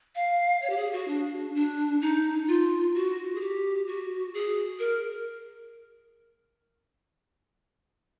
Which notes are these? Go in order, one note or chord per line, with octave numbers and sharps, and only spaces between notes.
F5
C#5
G4
G#4
F#4
D4
D4
D#4
F4
F#4
G#4
G4
F#4
G#4
A#4